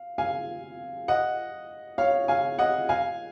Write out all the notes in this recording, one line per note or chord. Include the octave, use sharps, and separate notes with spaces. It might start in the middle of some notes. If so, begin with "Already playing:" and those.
Already playing: F5
F5 G#5
D#5 F#5
C#5 F5
F5 G#5
D#5 F#5
F5 G#5